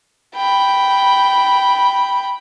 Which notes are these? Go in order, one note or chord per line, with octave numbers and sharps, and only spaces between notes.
G5 B5